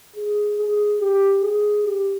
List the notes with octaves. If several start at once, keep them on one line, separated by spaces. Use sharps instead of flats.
G#4
G#4
G4
G#4
G4